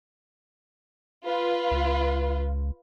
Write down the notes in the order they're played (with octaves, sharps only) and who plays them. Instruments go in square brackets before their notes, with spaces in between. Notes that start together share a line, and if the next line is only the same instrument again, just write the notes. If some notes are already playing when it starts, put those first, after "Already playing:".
[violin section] F4 B4
[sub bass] C#2